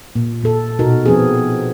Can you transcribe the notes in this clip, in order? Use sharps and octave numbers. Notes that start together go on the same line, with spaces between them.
A#2
A#2 A4
B2 D#4 F#4 A#4
F3 B3 C4 G#4